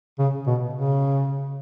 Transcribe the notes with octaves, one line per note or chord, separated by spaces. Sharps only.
C#3
B2
C#3